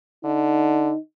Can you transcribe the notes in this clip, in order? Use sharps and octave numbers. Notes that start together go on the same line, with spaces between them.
D3 D#4